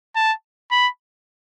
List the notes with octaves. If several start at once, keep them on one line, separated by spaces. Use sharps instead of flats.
A5
B5